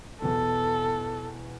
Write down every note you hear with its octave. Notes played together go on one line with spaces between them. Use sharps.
E2 B2 A4